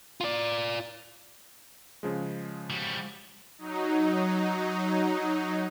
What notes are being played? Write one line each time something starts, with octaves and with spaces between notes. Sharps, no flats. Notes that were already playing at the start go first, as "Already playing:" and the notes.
F4 D5
C#3 F3 G#3
G3 F#4
F#3 D#4